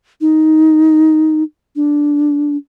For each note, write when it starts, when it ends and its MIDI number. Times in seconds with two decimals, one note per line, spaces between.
0.21 1.43 63
1.76 2.57 62